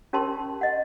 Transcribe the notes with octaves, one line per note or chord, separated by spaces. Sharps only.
C#4 G4 A#4 A5 C6
D#5 F#5